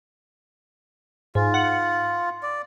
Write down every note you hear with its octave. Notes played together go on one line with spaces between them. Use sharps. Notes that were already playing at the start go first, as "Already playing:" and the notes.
G#2 F4
F#5
D5